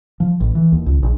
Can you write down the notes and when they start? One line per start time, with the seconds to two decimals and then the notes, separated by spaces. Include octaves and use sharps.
0.20 F3
0.40 A1
0.55 E3
0.72 D#2
0.86 C#2
1.03 A#1